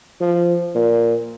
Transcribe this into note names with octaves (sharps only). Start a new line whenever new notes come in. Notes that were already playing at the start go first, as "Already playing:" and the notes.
F3
A#2